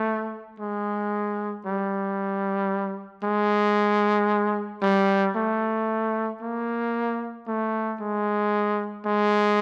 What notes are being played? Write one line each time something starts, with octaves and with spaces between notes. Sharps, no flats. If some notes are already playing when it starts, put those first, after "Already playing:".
Already playing: A3
G#3
G3
G#3
G3
A3
A#3
A3
G#3
G#3